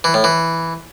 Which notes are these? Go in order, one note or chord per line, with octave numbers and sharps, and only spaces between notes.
E3
A2
E3